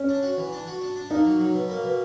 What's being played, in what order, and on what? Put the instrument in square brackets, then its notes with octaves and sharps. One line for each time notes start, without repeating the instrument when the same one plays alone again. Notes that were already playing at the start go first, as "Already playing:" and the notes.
Already playing: [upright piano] C#4
[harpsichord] D4
F#4
E3
D4
F#4
D4
D4
[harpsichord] A#3 [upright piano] D#4
[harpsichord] F#3
F#3
B2
A#3
B2